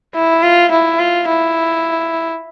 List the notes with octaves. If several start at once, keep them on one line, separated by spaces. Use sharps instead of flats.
E4
F4
E4
F4
E4